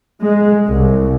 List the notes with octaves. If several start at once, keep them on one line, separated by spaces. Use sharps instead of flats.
G#3
C2